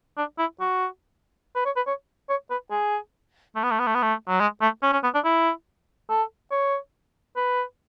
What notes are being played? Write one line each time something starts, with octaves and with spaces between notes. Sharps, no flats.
D4
E4
F#4
B4
C#5
B4
C#5
C#5
B4
G#4
A3
B3
A3
B3
A3
B3
A3
F#3
G#3
A3
C#4
C#4
B3
D4
E4
A4
C#5
B4